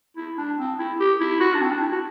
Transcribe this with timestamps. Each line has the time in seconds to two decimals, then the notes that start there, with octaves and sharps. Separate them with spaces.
0.17 E4
0.38 D4
0.58 C4
0.79 E4
1.00 G4
1.21 E4
1.40 F#4
1.54 D4
1.62 C4
1.71 D4
1.81 E4
1.92 F#4